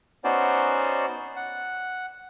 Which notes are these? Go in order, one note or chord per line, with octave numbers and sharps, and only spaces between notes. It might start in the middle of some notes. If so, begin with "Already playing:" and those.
B3 C#4 D#4 F#4 C5 D5
F#5